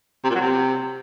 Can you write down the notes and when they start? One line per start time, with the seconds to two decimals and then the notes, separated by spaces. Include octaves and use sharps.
0.24 C3
0.30 A#2
0.35 F#3
0.41 C3